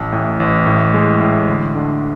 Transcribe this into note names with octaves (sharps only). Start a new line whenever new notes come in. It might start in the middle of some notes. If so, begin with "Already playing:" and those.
Already playing: A1
A2
A1
A2
G#3
A2
D2
D3